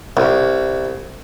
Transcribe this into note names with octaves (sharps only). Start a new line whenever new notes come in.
C2